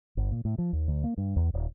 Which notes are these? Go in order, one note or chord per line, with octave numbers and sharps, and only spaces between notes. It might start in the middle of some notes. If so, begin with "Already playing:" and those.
G1
A#2
A2
F3
D#2
D2
A#3
G2
E2
D#1